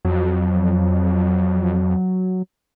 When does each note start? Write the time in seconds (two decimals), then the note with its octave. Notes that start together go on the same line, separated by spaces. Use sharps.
0.05 F2 F#3